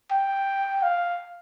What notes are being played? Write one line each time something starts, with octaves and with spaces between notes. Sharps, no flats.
G5
F5